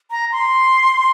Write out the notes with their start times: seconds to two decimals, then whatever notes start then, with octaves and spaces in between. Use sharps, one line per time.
0.11 A#5
0.32 C6